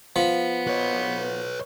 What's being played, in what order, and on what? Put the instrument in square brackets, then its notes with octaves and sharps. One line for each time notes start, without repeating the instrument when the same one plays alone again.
[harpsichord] F3 [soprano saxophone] B3
[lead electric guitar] B4 C#5